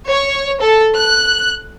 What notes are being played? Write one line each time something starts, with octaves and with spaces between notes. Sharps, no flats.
C#5
A4
F#6